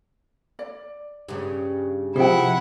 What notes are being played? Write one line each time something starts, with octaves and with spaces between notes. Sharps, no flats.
D5
G2 C#3
C3 F3 E4 G#4 F#5 G5